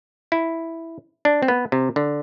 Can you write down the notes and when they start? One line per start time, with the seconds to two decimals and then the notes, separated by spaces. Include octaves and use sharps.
0.32 E4
1.25 D4
1.43 C4
1.48 B3
1.72 C3
1.96 D3